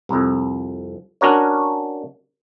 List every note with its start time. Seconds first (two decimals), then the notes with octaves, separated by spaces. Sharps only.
0.09 C2 F2
1.21 C#4 D4 F#4 A#4 C#5